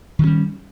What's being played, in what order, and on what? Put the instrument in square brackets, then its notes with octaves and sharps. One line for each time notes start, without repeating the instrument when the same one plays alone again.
[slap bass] D#3
E3
C#4
G3